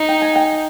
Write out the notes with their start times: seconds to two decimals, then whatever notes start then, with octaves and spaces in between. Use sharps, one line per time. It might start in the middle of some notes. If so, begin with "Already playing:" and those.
Already playing: D#4
0.08 G5
0.22 G#5
0.35 G5